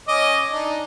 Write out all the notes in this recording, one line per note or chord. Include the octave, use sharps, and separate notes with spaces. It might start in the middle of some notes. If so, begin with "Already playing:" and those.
C#4 D#5 D6
D4 D#4